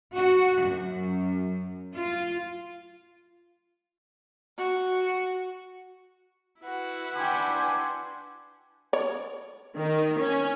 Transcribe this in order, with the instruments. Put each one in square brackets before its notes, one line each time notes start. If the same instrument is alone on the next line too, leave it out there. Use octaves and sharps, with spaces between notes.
[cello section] F#4
F#2
F4
[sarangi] F#4
[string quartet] E4 F#4 B4
[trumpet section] D4 C6 D6 [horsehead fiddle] G5 G#5
[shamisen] C#5
[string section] D#3
C#4